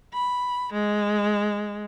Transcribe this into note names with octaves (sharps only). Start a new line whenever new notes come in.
B5
G#3